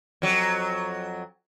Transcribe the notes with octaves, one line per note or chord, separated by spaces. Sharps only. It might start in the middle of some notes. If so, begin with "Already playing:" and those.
F2 F#3